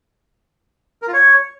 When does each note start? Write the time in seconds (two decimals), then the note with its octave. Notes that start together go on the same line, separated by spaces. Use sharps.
1.02 A#4
1.08 F4
1.13 C#5